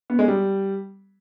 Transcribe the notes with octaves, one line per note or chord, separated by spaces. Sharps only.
B3
G#3
G3